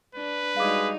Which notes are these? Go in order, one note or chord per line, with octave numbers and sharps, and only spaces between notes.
D4 B4
G3 G#3 D#4 F#4 G#4 F5 D6